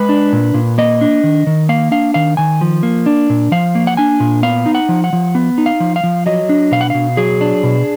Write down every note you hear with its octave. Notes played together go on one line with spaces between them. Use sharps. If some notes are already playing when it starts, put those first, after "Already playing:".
Already playing: G#3 B4
D4
A#2
A#2
A#3 D#5
D4
D#3
D#3
A#3 F5
D4 F5
D#3 F5
D#3 G#5
F3
A#3
D4
A#2
F3 F5
A#3
F#5
D4 G#5
A#2
B3 F5
D#4
F#5
F3
F#5
F3
B3
D#4
F5
F3
F5
F3
F#3 D#5
D4
B2 F5
F#5
B2 F5
F#3 G#4
D4
B2